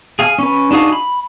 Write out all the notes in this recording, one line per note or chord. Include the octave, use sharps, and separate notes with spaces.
G#4 F5 G#5
C#4 B4
D4 D#4 F#4 G#4 F5
B5